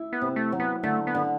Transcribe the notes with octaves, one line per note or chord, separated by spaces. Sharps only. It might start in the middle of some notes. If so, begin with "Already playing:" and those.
Already playing: E4
B3
C3
A3
F#3
B3
D3 A3
B3
D3